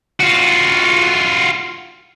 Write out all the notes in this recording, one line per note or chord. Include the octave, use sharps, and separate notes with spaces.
F4 F#4